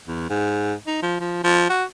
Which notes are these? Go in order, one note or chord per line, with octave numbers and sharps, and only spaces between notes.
E2
G#2
D#4
F3
F3
F3
F#4